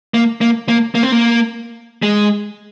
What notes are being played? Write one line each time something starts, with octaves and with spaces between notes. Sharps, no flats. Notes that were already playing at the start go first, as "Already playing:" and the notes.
A#3
A#3
A#3
A#3
C4
A#3
G#3